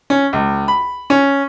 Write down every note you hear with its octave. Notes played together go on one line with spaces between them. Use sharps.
C#4
C#2
B5
C#4